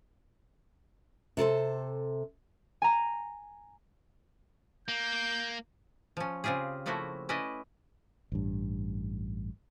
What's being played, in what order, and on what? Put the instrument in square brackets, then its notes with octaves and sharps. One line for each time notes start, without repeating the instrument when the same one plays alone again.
[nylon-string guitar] C3 A4 A#4 C5
[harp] G#5 A#5
[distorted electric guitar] A#3 [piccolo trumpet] G6
[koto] F3 C#4
C#3 C4 F4 G4 G#4
F3 A3 A#3 E4 F#4
C#4 E4 B4 D5 D#5
[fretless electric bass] A1 G2